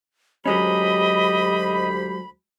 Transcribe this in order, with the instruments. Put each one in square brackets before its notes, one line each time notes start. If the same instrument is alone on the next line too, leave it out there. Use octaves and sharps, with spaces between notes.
[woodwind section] D2 C5 B5 [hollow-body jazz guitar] F#3 G#3 C#4 [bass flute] G4 [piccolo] D#5